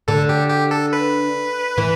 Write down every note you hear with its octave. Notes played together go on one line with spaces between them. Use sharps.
D3 A4
G4
G4
A4
B4
E3